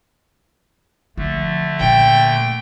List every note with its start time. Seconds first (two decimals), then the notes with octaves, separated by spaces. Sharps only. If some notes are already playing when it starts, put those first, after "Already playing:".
1.18 D3 F3 A3
1.80 A#2 G5